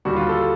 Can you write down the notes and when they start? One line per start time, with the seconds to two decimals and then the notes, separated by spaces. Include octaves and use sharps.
0.05 D#2 D3 G3 F#4
0.16 F4
0.29 A4